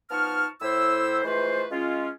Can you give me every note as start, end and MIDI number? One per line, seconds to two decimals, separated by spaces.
0.11 0.47 53
0.11 0.47 59
0.11 0.47 63
0.11 0.47 81
0.11 0.47 85
0.11 0.47 89
0.62 1.21 45
0.62 1.21 64
0.62 1.21 72
0.62 1.21 88
1.24 1.65 52
1.24 1.65 56
1.24 1.65 57
1.24 1.65 65
1.24 1.65 71
1.24 1.65 72
1.71 2.09 56
1.71 2.09 61
1.71 2.09 65